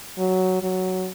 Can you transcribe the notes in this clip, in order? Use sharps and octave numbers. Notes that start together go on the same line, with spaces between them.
F#3
F#3